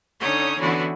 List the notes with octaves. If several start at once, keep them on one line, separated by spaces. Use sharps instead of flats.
D3 C#4 D#4 C#5 D#6 G6
D3 E3 B3 C#4 E4 F#4